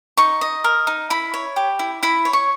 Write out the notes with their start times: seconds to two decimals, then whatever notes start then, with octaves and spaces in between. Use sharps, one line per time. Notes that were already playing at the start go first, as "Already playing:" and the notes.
0.17 D#4 C#6
0.41 D#5
0.64 A#4
0.87 D#4
1.10 E4 B5
1.34 C#5
1.56 G4
1.79 E4
2.03 E4 B5
2.25 C#5
2.33 C#6